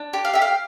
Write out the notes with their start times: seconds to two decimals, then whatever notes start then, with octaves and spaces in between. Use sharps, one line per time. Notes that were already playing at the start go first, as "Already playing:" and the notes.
Already playing: D4
0.13 G4
0.25 F5
0.33 G4 E5
0.42 F5